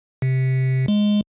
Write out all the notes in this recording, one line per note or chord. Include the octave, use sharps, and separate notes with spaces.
C3
G#3